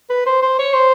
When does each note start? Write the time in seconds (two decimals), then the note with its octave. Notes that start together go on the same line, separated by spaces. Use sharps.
0.10 B4
0.26 C5
0.42 C5
0.59 C#5
0.74 C5